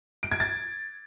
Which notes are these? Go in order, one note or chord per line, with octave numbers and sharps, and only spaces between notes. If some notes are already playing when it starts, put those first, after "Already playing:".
D7
G#6
A6